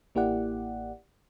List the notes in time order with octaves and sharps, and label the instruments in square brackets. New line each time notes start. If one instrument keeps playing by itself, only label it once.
[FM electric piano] A1 A#3 E4 G4 D5 F#5